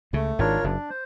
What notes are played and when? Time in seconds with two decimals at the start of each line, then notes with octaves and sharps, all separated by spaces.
0.13 C#2 C#3 A3
0.39 G#1 G#2 D4 F4 A#4 C#5
0.64 F#1 F#2 D4
0.90 C5